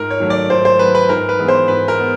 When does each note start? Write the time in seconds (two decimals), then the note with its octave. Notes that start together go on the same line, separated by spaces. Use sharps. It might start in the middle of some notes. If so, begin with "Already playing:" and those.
Already playing: G#2 A#4
0.10 C#5
0.20 D#3 F#3 A3
0.30 D5
0.50 G#2 C5
0.65 C5
0.79 D#3 F#3 A3 B4
0.95 B4
1.09 G#2 A#4
1.29 B4
1.39 E3 G#3 B3
1.48 C5
1.68 G#2 B4
1.88 A#4
1.98 G#3 B3